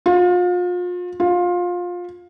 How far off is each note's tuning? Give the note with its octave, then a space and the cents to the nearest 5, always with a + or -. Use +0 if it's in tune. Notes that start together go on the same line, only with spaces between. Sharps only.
F4 +35
F4 +20